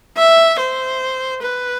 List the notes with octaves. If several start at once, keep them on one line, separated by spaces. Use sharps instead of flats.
E5
C5
B4